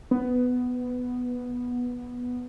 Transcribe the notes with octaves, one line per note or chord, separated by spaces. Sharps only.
B3